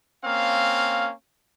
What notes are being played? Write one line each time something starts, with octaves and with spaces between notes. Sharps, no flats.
A#3 C4 C#4 F5